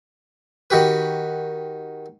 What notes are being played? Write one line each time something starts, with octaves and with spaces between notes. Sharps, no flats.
D#3 F#4 G4 B4